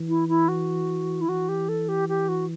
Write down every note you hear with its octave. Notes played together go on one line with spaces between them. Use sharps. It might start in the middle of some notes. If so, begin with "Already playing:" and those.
Already playing: E3
E4
E4
F#4
E4
E3 F#4
G4
A4
G4
G4
F#4